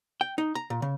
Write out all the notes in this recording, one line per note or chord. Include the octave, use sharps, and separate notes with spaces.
G5
D#4
A#5
A#2
C#3